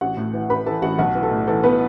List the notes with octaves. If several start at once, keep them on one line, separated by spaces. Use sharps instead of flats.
A1 F#4 F#5
A2
E3
A1 B4 B5
E3 A4 A5
A1 F#4 F#5
B1 F#4
E3
A4
A2
E3 A4
B3 B4